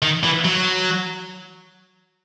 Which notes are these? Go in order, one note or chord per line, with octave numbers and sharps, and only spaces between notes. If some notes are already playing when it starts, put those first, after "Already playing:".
D#3
E3
F#3